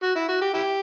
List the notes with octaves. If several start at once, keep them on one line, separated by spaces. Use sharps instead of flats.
F#4
E4
F#4
G4
E4 G4